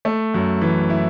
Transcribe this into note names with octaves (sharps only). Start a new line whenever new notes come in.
A3
F#2
E3
E4